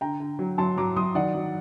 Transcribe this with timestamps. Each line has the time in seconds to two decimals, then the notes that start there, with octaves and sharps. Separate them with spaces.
0.01 D3 G5 A#5
0.20 D3
0.39 F#3
0.58 F#3 A5 C6
0.78 F#3 A#5 D6
0.96 F#3 C6 D#6
1.15 D#3 D5 F#5
1.35 F#3